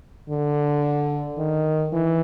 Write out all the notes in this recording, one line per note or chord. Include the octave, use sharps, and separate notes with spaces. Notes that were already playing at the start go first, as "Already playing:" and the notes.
D3
D#3
E3